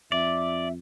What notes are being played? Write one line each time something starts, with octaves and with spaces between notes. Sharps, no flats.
F2 D5 E5